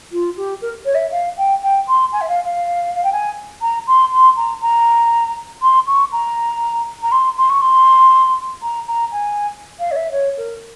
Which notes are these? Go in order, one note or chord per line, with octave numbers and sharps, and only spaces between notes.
F4
G4
A#4
C#5
E5
F5
G5
G5
C6
G#5
E5
F5
F5
F5
G5
G#5
A#5
C6
C6
A#5
A#5
C6
C#6
A#5
A#5
C6
C6
C#6
C6
A#5
A#5
G#5
F5
C#5
E5
C#5
A#4